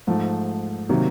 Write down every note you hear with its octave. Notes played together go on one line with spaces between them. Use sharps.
G#2 F3 A3
C3 D#3 F#3 A#3